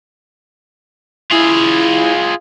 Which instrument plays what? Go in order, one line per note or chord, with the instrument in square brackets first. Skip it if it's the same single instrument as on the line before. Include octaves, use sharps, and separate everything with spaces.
[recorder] E4 [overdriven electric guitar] F4 G#4